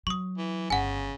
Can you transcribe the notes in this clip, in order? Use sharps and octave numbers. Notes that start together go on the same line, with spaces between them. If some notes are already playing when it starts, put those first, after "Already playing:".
F#3 C#6 D#6
E3
G1 C#3 F#5 G#5